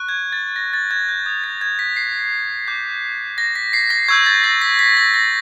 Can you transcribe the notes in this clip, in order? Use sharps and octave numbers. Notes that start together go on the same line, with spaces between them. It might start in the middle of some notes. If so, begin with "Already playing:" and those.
Already playing: C#6 F#6
G#6
A6
A#6
A6
G#6
G6
D#6 G6 G#6
A6
G#6
B6
C7
D6 G6
A#6
B6
C7
A#6
C#6 E6 G6 G#6
A6
A#6
B6
B6
A#6
A#6